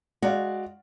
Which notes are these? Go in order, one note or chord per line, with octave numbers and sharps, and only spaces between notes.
G#3 F#4 D5 F5